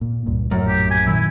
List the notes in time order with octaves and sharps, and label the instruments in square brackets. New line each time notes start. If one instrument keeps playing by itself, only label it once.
[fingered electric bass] A#2
C#2 G2 A#2
[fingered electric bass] A#1 A2 [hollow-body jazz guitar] F#2
[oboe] G4
G#5
[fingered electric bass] A#2 D#3 F#3 [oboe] E4